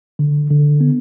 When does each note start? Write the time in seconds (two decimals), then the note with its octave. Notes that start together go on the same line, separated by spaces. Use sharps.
0.19 D3
0.50 D3
0.80 B3